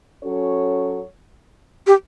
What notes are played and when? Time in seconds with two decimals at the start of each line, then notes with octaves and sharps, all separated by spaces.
0.23 F#3 C#4 F#4 A4 C#5
1.87 G4